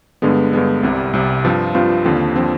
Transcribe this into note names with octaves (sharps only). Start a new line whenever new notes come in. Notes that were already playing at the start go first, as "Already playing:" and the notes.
G2 D3 G#3 B3
G2 D3 G#3 B3
C2 C3 G3
C2 C3 G3
G2 F3 C4 F4
G2 F3 C4 F4
D#2 D3 F3 C4
D3 F3 C4